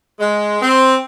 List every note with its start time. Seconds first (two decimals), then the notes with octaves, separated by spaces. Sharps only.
0.19 G#3
0.60 C4